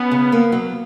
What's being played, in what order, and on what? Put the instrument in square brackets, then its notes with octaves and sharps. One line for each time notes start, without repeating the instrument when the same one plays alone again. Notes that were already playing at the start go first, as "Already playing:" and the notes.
Already playing: [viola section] B3 [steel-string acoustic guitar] C#4
[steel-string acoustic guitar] C#3
A#3
F#3